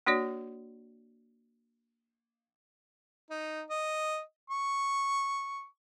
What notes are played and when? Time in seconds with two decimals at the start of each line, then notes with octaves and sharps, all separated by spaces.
0.06 A#3 D4 F#4 C#5 D5
3.30 D#4
3.70 D#5
4.50 C#6